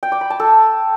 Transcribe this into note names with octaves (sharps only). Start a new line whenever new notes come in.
G5
D6
B5
A5
A4